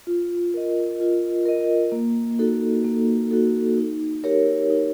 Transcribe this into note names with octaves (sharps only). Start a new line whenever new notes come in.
F4
A#4 D#5
F4
A#4 D#5
A#3
D#4 F#4 A4
A#3
D#4 F#4 A4
D#4
G4 A#4 C#5
D#4